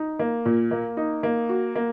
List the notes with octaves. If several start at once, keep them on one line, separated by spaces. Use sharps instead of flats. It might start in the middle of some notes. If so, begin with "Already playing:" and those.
Already playing: D#4
A#3
A#2
A#3
D#4
A#3
F#4
A#3